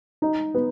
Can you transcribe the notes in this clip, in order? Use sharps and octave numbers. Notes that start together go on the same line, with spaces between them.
D#4
B3